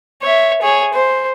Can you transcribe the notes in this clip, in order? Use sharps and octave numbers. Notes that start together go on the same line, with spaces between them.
C#5 E5
G#4 C#5
C5